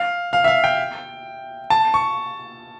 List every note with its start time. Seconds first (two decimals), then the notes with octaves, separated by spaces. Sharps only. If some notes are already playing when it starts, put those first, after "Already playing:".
Already playing: F5
0.33 F5
0.44 E5
0.48 F5
0.64 G5
1.70 A5
1.94 C#6